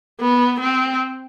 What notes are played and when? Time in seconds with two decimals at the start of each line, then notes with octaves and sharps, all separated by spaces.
0.21 B3
0.60 C4